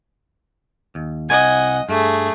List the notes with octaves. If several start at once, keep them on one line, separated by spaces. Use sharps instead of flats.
D#2
C2 D#5 F#5 G#5
G2 A3 G#4